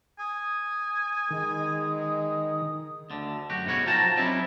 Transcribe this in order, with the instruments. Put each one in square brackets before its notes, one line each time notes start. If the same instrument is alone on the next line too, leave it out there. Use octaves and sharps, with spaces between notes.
[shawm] G#5 [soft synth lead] D#6
[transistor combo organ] D#3 [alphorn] G#3
[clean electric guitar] D2 D3
F#2 F#4 G4
G#2 B2 F#4 C#5
F3 F#3 A#4 G5 A5 A#5
F#3 G3 C4 C#4 D#4 E4